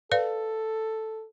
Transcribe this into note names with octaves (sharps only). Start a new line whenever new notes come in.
A4 B4 D5 F5